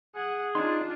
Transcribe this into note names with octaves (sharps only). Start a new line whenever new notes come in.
G#4 F#5
D4 D#4 F4 C6